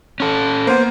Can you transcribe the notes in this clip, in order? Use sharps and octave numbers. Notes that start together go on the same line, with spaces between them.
C#4 A4
A#3 B3 C5